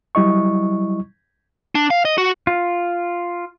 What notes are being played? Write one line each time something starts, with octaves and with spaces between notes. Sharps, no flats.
F#3 G3 E4 D#5 C#6
D4
F5
D#5
F#4
F4